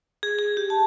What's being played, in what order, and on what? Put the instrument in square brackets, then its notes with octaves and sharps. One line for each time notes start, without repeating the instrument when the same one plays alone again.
[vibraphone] G#4
G#4
G4
A5